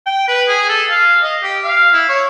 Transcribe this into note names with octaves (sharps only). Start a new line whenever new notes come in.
G5
B4
G#4
A4
F5
D#5
G4
F5
E4
C#5